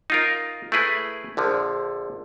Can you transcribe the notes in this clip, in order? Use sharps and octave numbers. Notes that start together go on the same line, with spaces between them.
D#4 F4 A#4
A3 E4 G#4 B4
A#1 D3 F3